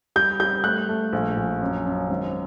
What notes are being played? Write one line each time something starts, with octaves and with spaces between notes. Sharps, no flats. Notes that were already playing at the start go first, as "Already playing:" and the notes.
G3 G6
G3 G6
A3 F#6
A3
A#1
A#1
F#2
F#2
G#1